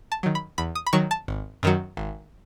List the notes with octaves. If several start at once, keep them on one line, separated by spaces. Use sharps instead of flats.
A5
D#3 F#3
B5
E2 B5
D#6
B5
D#3 F#3 C#6
A5
G#1
F#2 D#3 F#3
G#1